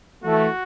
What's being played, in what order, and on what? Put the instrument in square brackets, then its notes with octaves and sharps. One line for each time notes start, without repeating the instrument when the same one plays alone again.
[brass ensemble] E3 A3 [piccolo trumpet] F#4